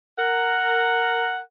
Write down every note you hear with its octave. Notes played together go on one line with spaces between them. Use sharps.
A#4 F#5